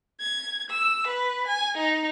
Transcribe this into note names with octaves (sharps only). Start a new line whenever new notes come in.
G#6
E6
B4
G#5
D#4